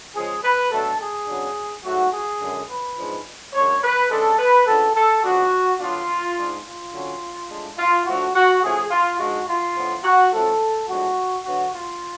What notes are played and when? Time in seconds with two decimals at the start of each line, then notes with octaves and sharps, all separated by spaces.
0.15 C#3 F3 G#3 C#4 G#4
0.44 B4
0.71 B2 F#3 A3 D4 A4
1.00 G#4
1.27 C#3 F#3 B3 D4
1.85 G#2 F#3 A3 F#4
2.13 G#4
2.41 F#2 D3 G#3
2.70 B4
2.98 G#2 F3 G#3 D4
3.54 F#2 C#3 G#3 D4 C#5
3.83 B4
4.10 C#3 G#3 D4 A4
4.39 B4
4.67 C#3 F3 B3 D4 A4
4.96 A4
5.23 C#3 F3 B3 D4 F#4
5.80 D3 F#3 B3 D4 F4
6.36 G#2 G#3 D4
6.66 F4
6.93 D3 F#3 C#4
7.50 A2 G#3 D4
7.78 F4
8.06 A2 F3 A3 D4 F#4
8.35 F#4
8.63 C#3 F3 A3 G#4
8.91 F4
9.19 G#2 F3 G#3 D4 F#4
9.48 F4
9.75 A2 F3 B3 D4
10.04 F#4
10.32 A2 F3 A3 C#4 A4
10.88 A2 F3 G#3 B3 D4 F#4
11.45 D3 F#3 B3 D4 F#4
11.73 F4